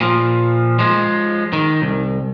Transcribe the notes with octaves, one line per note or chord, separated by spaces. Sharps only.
A#2 F3
F3 G#3
D#3
C2